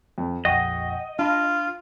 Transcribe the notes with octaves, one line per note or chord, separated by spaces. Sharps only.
F2
A#1 F2 D#5 F#5 G5 C#6
D4 F4 A5 B5